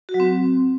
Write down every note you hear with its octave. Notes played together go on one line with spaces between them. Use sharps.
F#4
F#3
C4